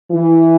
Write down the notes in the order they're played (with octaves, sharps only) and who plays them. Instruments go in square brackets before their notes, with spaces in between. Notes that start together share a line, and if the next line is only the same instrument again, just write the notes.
[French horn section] E3